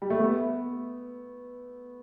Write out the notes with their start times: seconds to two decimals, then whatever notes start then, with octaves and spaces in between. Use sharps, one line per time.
0.02 G3
0.10 A3
0.19 B3